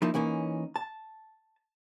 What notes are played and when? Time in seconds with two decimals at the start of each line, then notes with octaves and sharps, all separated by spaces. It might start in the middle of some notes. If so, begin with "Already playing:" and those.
0.02 F3 A#3 D#4 E4
0.14 E3 A#3 C#4 D#4
0.76 A5